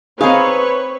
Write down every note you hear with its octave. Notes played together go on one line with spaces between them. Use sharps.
C4 D#4 G#4 B4 C#5 F5